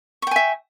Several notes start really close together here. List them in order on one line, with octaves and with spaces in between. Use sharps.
C#6 G5 G#5 E5